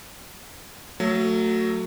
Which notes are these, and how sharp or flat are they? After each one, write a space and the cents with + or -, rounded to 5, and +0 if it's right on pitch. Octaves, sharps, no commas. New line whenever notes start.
F#3 +0 A3 +25